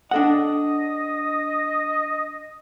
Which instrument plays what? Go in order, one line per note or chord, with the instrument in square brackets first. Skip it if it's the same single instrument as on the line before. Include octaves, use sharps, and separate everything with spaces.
[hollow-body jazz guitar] D4 A4 F#5 [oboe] D#5